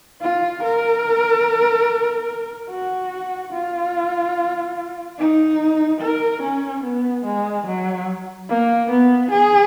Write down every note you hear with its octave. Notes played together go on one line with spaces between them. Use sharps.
F4
A#4
F#4
F4
D#4
A#4
C#4
B3
G#3
F#3
A#3
B3
G#4